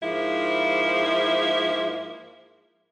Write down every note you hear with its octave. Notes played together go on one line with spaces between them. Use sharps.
G#2 F3 A#3 E4